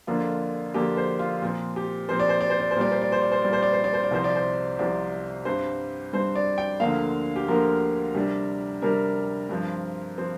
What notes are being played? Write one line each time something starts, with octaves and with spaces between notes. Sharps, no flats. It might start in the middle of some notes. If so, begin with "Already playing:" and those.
F2 D3 A#3 D4 F4
F2 D3 A#3 D4 G4
C5
F4
A#2 F3 C4
G4
A#2 F3 C4 C5
D5
C5
D5
C5
D5
C5
A#2 G3 C4 D5
C5
D5
C5
D5
C5
A#2 G3 C4 D5
C5
D5
C5
D5
C5
D5
C2 C3 F3 C4 C5
D5
C5
C2 C3 F3 C4 D5
G2 G3 C4 C5
G2 G3 C4 C5
D5
G5
D2 D3 F3 A#3 F5
G4
D2 D3 F3 A#3 A#4
C3 G3 D4
C3 G3 D4 A#4
G2 F3 C4
F3 C4